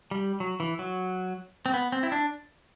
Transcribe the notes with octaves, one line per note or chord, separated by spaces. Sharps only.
G3
F#3
E3
F#3
C4
B3
C4
E4
D4